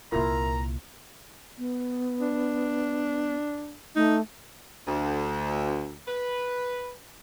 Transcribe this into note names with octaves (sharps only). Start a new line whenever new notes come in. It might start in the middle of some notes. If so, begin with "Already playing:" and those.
C2 A#2 A#3 E4 F4 A#4 A#5
B3
D4
A3 D#4
D2
B4